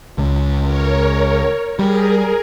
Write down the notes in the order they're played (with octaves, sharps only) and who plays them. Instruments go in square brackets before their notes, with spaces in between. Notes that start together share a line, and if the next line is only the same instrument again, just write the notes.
[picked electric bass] C#2
[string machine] A#4 C#5
[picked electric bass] G3 [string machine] G#4 A#4